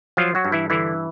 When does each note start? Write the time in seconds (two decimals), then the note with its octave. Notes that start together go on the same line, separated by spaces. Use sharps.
0.17 F3 F#3 F4
0.35 F#3 F#4
0.45 G2
0.52 E3 E4
0.70 D3 E3 E4